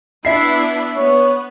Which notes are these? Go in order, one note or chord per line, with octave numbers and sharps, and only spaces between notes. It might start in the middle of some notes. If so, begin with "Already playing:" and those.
B3 D4 E4 E5 C7
B3 C#5